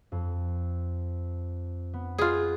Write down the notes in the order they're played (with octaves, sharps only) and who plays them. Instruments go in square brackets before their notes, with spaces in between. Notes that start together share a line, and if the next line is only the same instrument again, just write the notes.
[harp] F2
B3
[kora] F4 G#4 [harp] B4